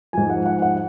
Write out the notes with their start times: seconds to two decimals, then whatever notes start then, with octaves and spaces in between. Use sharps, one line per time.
0.13 G#2 F3 G#5
0.30 F#5
0.46 F#5
0.62 F#5